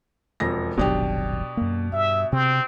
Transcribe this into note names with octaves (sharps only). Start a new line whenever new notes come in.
E1 F2 A#6
D#1 G#1 B2 F#3 D4 G4
F#2 A#3
G2 E5
C3 C4